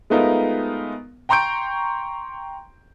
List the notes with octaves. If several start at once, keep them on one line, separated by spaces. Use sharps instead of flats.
G#3 A3 B3 D#4 F4 A#4
G5 A#5 C6 C#6 G6 D7